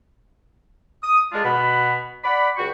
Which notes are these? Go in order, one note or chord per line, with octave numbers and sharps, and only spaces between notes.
D#6
G#3 D4 F4
B2 F#5 B5
D5 F#5 B5
C#2 F#4 G5 C#6